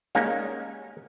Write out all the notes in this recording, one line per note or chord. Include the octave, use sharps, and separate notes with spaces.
G3 G#3 A#3 C#4 D#4